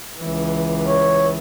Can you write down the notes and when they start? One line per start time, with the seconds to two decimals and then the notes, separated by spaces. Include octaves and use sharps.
0.19 C#2 E3
0.87 C#5